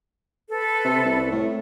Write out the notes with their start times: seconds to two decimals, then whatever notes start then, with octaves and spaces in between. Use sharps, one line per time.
0.48 A4 B4
0.84 C3
1.05 C2
1.32 A2